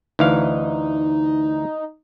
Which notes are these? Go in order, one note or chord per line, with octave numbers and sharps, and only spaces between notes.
D2 E3 D#4 F5